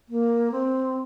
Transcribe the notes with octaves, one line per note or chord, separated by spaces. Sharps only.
A#3
C4